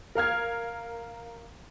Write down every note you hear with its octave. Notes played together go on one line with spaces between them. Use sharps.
A#4 F5 F6 G#6